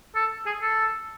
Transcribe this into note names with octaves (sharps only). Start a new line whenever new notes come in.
A4
G#4
A4